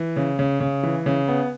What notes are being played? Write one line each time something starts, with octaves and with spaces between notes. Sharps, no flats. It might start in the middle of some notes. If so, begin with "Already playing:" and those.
Already playing: E3
C#3
C#3
C#3
E3
C#3
B3